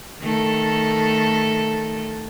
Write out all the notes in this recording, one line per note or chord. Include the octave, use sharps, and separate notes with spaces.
D#3 A3 A4